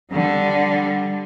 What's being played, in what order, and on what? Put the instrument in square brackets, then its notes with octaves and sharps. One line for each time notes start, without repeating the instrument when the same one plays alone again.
[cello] D3 G3